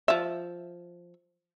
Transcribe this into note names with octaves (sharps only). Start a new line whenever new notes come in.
F3 E5